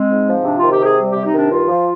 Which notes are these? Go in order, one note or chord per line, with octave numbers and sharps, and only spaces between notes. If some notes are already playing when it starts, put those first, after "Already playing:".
Already playing: G#3 C4
G#2
F3
C3 D4
D#3 F4
G4
C3
G#4
G3
C3 G4
D#4
D#3 D4
G2 F4
F3